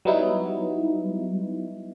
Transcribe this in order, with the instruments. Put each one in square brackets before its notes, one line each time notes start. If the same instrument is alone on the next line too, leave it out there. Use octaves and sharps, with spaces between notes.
[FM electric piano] F#3 G3 B3 D#4 E4